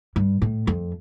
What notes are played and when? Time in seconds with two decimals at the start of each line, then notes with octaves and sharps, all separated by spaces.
0.16 G2
0.42 A2
0.67 F2